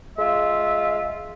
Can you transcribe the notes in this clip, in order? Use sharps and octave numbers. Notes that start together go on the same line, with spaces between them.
G#3 F4 E5